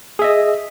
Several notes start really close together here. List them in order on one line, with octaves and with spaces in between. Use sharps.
G#4 E5 D#5